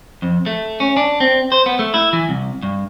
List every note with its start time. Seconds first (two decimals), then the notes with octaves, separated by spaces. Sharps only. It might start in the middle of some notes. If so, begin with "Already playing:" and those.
0.22 F2
0.46 A3
0.80 C#4
0.97 D4
1.20 C4
1.52 C5
1.66 B3
1.79 A3
1.94 E4
2.13 E3
2.29 C2
2.63 G2